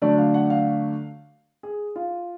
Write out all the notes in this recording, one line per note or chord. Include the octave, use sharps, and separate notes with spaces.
D3 F#3 A3 D4 D5
F5
F#5
F5
G#4
F4